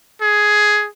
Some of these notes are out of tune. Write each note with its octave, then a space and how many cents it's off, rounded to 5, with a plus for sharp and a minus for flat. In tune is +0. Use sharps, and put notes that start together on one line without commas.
G#4 +10